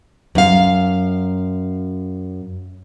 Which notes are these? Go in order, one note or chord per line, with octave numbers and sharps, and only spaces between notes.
F#2 F5